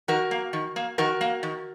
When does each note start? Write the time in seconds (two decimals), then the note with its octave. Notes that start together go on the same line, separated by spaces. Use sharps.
0.08 D#3 F#4 A#4
0.31 A#3
0.53 D#3
0.76 A#3
0.98 D#3 F#4 A#4
1.21 A#3
1.43 D#3